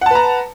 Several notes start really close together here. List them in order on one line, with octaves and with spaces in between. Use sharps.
F#5 A5 B4 A#5